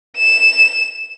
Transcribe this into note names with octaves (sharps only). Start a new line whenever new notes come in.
E7